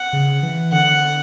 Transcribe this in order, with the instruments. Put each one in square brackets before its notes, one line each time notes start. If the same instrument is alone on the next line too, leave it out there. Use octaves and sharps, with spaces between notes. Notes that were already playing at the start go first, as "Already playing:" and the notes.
Already playing: [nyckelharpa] F#5
[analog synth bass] C#3
E3
[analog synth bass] D3 [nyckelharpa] F#5